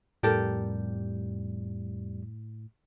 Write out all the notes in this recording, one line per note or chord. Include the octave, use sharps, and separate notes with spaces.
F2 A2 G3 G4 A4 A#4